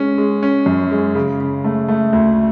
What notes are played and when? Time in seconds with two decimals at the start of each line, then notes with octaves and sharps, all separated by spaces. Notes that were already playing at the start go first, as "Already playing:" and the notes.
Already playing: G#3 C#4
0.18 G#3
0.43 C#4
0.66 F#2
0.91 G#3
1.15 C#3
1.40 C#3
1.64 A3
1.88 A3
2.13 D2